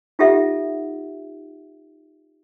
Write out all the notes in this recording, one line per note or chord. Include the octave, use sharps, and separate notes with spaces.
D#4 F4 G4 A4 E5 F#5